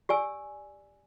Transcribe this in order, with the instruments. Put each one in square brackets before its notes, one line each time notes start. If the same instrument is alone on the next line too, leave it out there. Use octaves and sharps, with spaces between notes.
[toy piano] G4 D5 G#5 E6